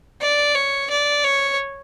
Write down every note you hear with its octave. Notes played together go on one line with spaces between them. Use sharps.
D5
C#5
D5
C#5